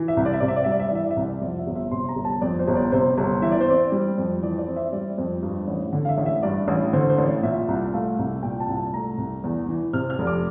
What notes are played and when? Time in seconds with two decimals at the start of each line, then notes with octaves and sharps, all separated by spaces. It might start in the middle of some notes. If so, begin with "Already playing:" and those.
Already playing: E3
0.08 E5
0.17 C2
0.25 D5
0.33 E5
0.40 C3 D5
0.48 E5
0.56 D5
0.64 G3 E5
0.72 D5
0.80 E5
0.88 D5
0.91 E3 E5
1.03 D5
1.11 E5
1.17 C2 D5
1.42 F2 D5
1.58 E5
1.67 G1
1.76 E5
1.91 C3 C6
2.08 A#5
2.16 G1
2.25 A5
2.41 F2 D5
2.59 C5
2.68 G1
2.76 D5
2.92 C3 C5
3.18 G1
3.42 E3 E5
3.52 D5
3.60 C5
3.67 C4 D5
3.92 G3
4.18 F2
4.42 E3 D5
4.59 D5
4.67 C4
4.76 E5
4.93 G3 D5
5.18 F2
5.43 G2
5.68 A1
5.93 D3
6.05 F5
6.09 E5
6.18 A1
6.26 E5
6.42 G2 D5
6.68 A1
6.93 D3 C5
7.10 C5
7.18 A1
7.26 D5
7.43 A#2 E5
7.68 C2
7.93 A3 F5
8.19 C2
8.43 A#2 G5
8.60 A5
8.68 C2
8.77 A5
8.93 A3 A#5
9.18 C2
9.44 E2
9.69 E3
9.93 C3 F6
10.10 F6
10.19 F1
10.27 D6